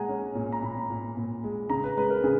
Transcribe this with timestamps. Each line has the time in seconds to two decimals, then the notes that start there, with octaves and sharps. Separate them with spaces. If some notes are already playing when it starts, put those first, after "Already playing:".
Already playing: A#2 G#3 F#5 G#5 A#5
0.09 C#4
0.35 A#2
0.52 A#5
0.63 A#2 B5
0.90 A#2
1.17 A#2
1.44 G#3
1.70 C#3 A#5
1.84 B4
1.97 G#3 B4
2.10 A#4
2.24 C#3 G#4